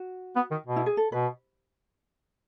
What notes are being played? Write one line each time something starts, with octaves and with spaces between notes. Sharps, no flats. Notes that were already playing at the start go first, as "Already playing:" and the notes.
Already playing: F#4
B3
D#3
B2
E4
G#4
A4
B2 B4